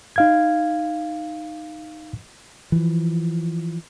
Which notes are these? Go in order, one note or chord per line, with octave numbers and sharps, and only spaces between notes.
D#4 F5 G#6
E3 F3